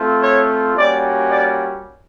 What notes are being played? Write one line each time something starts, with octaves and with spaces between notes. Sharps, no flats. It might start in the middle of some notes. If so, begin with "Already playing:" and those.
Already playing: A3 C4 F4
C#5
G3 A#3 C#4 F#4 D5
D5